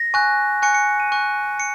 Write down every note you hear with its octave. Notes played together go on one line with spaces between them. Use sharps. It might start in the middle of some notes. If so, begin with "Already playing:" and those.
Already playing: A#6
G#5 C#6 F#6
G#5 C#6 F#6 C#7
C#7
D#7
G#5 C#6 F#6
C#7